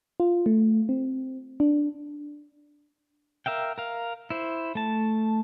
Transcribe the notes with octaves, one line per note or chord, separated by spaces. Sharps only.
F4
A3
C4
D4
A#4 E5 F5 G5
A#4 F5
E4 C5
A3 A5